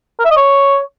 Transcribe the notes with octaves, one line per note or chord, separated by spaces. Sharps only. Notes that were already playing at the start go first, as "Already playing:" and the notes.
A#4
E5
D#5
C#5